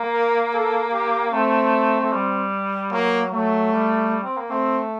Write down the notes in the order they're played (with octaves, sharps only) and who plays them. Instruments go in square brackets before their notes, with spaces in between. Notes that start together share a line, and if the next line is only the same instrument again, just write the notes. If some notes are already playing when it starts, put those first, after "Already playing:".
Already playing: [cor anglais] A#3
[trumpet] A#4
A4
G4
[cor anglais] A3 [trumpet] C4
[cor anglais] A3
G3
[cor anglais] F#3 [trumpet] A#3
[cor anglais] F#3 [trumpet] A3
[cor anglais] G3
C4
A#3
[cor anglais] A3 [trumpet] C4